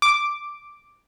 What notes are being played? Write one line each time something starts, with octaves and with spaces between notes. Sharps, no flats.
D6